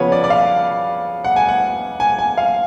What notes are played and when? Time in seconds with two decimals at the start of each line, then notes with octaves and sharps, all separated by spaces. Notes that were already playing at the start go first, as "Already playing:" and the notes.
Already playing: C#3 F3 B3 B4 C#5
0.12 D5
0.24 D5
0.30 F5
1.24 F#5
1.36 G#5
1.49 F#5
2.00 G#5
2.19 G#5
2.38 F5